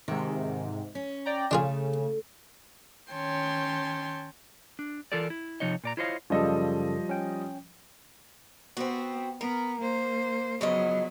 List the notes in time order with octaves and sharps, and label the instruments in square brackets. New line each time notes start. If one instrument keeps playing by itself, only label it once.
[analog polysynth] G#2 C3 [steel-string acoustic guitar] D#3
[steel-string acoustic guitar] C#4
[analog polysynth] D5 G5 A#5
[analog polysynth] C#3 [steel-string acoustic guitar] A3 [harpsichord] D4 F4 G#4
[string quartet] D#3 C#4 C#5 G5 A5 C6
[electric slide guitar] D4
E3 F4 A4 A#4 D5
E4
C3 F3 D#4 C#5 D#5
A#2 D5 A#5
E4 F4 C5 C#5 D#5 F5
[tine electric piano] F#2 C#3 A4 [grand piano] F3 G3 D#5
[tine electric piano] C#4 G5
[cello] B3 [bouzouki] C4 F#4
[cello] B3 [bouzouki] A#4
[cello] A#3 C5
[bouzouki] C#3 F3 D#5 [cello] F#3 B3